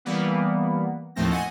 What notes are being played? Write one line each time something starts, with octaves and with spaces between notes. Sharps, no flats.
E3 G3 A#3 B3
D#2 A2 F3 A3 C4 A#6
D#5 F#5 G#5